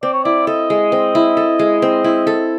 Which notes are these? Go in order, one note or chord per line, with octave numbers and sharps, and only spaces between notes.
C4 D5
C#5
E4 D5
A4 D#5
G#3
C4
E4
A4
G#3
C4
E4
A4